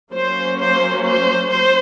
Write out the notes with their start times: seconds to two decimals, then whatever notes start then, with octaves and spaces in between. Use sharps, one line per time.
0.12 F#3 A#3 C#4 C5
0.58 C5
1.03 C5
1.49 C5